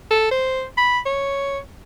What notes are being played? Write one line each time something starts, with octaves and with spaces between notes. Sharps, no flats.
A4
C5
B5
C#5